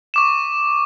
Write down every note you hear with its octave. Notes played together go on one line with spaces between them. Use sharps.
C#6 D6 E7